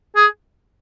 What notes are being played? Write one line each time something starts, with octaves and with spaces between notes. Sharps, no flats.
G#4